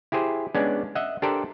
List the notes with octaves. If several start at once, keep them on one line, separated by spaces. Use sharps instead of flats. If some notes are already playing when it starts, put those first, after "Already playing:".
E4 G4 G#4 C5
G#3 B3 C#4 D4 D5
D#5 E5 F#5
D4 G4 A4 A#4 C5 D5